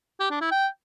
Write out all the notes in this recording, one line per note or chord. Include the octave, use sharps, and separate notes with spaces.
G4
D4
E4
G5